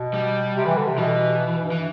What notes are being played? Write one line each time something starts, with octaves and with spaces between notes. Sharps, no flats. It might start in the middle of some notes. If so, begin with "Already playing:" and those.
Already playing: B2
G3
C3
E3
D3
C3
B2 E3
G2
E3